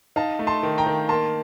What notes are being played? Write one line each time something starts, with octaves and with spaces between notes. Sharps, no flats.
D#4 F5 A5
A3
A5 C6
D#3
G5 A#5
D#3
A#3 A5 C6